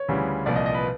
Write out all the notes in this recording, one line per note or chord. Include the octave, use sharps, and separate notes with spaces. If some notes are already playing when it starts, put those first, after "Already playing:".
Already playing: C#5
D2 C#3 E3 G3
C2 A#2 F3 D5
D#5
D#5
B4